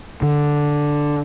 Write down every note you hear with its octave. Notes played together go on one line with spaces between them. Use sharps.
D3